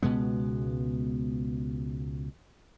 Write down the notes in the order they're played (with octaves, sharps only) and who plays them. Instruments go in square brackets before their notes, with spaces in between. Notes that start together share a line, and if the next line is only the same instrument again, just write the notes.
[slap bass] C#2 B2 G#3 B3